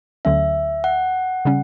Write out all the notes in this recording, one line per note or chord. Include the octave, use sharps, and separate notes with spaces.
D2 D3 F#3 C#4 E5
F#5
C#3 G3 C#4